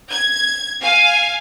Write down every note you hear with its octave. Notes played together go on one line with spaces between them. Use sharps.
G#6
F5 G#5